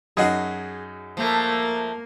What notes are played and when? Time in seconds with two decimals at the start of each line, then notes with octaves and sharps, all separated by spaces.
0.17 F#2 D#4 F#4 G#4
1.17 F3 A3 A#3 A#4